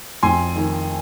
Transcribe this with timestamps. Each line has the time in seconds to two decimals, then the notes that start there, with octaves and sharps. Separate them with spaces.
0.23 F2 G#5 C6
0.56 D#3